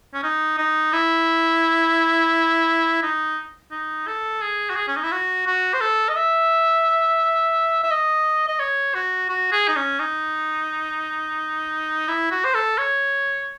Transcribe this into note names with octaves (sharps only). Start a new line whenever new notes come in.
C#4
D#4
D#4
E4
D#4
D#4
A4
G#4
F#4
G#4
C#4
D#4
E4
F#4
F#4
C5
A4
D#5
E5
E5
D#5
D#5
C#5
F#4
F#4
G#4
D#4
C#4
D#4
E4
F#4
C5
A4
C#5